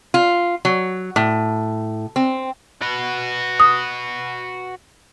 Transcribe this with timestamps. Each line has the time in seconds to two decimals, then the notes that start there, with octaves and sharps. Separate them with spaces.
0.14 F4
0.65 F#3
1.16 A2
2.16 C4
2.82 F#4 B4
3.60 D#6